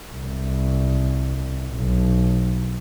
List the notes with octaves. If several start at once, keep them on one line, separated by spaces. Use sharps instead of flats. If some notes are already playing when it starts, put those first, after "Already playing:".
C2
B1